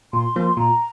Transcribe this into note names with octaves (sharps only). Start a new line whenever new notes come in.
A#2 C6
F3 A#3
A#2 A#5